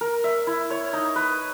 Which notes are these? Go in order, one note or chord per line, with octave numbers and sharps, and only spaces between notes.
A#4
E5
E4
C#5
D#4
B4